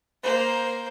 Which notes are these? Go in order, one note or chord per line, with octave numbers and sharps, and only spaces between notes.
A#3 C5